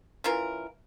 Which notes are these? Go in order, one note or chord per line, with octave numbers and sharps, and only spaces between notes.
E3 C#4 F4 A#4